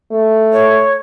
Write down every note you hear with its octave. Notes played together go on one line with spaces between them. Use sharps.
A3
C#5